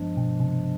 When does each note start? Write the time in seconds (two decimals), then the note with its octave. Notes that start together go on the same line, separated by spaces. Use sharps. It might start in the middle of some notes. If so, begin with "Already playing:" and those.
Already playing: G2 F3 G#3 B3 D4
0.17 B2
0.40 C3